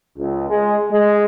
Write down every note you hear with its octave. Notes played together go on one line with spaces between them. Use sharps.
C#2
G#3
G#3